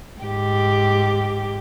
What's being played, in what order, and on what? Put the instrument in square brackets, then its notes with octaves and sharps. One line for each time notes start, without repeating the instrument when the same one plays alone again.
[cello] G#2 G4